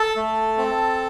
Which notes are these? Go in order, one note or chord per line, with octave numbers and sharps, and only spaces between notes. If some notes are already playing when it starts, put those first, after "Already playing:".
Already playing: A4 A5
A3
C4